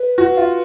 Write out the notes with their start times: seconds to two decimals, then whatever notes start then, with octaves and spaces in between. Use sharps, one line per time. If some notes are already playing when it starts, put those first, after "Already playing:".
Already playing: B4
0.18 F#4
0.37 F4